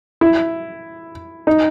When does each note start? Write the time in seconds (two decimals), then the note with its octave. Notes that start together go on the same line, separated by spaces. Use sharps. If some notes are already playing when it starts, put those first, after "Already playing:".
0.21 E4
1.47 D#4